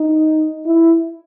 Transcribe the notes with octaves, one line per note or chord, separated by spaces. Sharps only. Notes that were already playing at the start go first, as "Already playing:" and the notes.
Already playing: D#4
E4